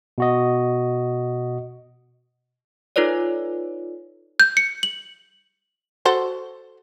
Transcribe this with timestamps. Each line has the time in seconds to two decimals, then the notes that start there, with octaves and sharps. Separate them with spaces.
0.18 B2 F#4 D#5
2.96 D#4 F4 A4 B4 C#5 D5
4.40 G6
4.57 C#7
4.83 F#7
6.05 F#4 A4 C5